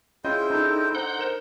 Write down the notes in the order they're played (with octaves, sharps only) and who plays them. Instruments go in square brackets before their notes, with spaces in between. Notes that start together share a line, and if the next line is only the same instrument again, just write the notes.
[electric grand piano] C#4 F4 D#5 [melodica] E4 C5 G5 [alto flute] G#4
[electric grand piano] D4 A4 [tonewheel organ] D#4
[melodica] D#4 [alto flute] C5 [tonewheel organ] F#5 G6
[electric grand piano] A#4 E7